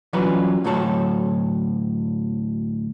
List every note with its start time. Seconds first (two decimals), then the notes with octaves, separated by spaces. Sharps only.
0.13 E3 F#3 G3 C#4 F4 B4
0.64 D2 A2 C3 F#3 A4 C#5